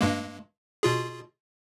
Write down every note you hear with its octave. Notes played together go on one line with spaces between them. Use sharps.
G2 G#3 A#3
B2 F4 G#4